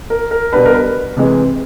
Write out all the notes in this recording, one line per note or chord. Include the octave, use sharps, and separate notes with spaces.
A#4
A#4
B2 G3 B3 D4 B4
A#4
B4
C3 E3 G#3